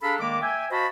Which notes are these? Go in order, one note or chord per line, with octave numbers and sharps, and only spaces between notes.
D4 G#4 A4 F5 A#5 B5
D#3 G#3 A#3 D5 D6
E5 G5 G#5
F#4 C5 D#5 F5 A5 B5